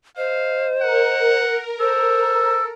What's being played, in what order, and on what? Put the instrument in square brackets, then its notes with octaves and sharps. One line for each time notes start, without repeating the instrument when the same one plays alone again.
[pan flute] C5 [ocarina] D#5 [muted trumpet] F5
[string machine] A#4 [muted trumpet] F#5
[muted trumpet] A4 [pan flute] C5 [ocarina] E6